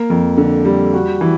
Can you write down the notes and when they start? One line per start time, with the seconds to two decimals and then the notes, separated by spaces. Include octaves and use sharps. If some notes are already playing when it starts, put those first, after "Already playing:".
Already playing: A#3
0.10 F2
0.37 D3
0.65 G3
0.94 F#4
1.21 E3